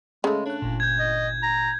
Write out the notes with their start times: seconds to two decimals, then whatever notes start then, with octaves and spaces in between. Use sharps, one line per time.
0.24 C#3 G#3 A3 A5
0.46 D4 C#5 F#6
0.62 G1 A#2
0.80 G6 G#6
0.99 D#5
1.43 A#5